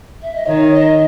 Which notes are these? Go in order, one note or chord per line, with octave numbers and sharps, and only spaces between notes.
E5
D#5
D#3 C#5
D#5